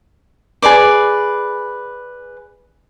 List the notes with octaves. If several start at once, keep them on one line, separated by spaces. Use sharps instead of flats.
G#4 B4 D5 D6